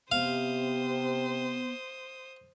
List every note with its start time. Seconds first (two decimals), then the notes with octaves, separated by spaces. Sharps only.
0.12 C3 B3 C5 F5 D#6